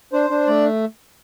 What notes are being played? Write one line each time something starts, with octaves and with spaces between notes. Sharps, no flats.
D4 C5
D4
A3 D5